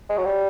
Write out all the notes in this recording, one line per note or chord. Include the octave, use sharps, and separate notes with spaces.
G#3
F#3
G3